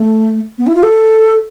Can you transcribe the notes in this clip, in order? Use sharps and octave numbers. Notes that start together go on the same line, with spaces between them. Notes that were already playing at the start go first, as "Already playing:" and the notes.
Already playing: A3
B3
E4
F4
A4